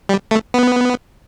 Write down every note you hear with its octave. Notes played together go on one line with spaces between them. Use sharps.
G3
A3
B3